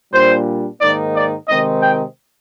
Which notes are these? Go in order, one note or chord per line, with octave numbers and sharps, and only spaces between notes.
A#2 G3 D4 C5
G#2 D#3 A#3 D#4 D5
D5
C3 D#3 G#3 C4 D#4 D#5
G5